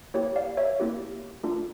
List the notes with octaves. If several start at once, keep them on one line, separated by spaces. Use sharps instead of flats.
A#3 E4 G4 C#5
D5 F5
C#5 E5
A#3 E4 G4
A3 D4 F4